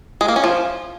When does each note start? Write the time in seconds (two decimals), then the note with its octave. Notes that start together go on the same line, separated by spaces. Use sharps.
0.21 G#3
0.28 A#3
0.36 C#4
0.44 F3